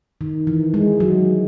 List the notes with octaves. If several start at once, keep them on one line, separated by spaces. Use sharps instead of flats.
D#3
E3
G#3
F#3